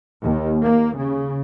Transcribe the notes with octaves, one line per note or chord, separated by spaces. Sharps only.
D#2
A#3
C#3